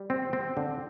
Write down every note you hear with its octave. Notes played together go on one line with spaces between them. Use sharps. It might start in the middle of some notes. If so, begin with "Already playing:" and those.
Already playing: G3
C4
C4
D3